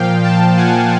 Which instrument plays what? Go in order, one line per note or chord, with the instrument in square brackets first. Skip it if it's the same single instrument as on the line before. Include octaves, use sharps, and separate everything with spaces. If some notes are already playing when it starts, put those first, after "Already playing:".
Already playing: [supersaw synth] A#2 F3 F5 G5
G5 A5
F#5 G#5